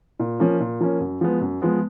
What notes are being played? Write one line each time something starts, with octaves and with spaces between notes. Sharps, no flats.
A#2
F3 A#3 C#4
A#2
F3 A#3 C#4
F#2
F3 G#3 B3
F#2
F3 G#3 B3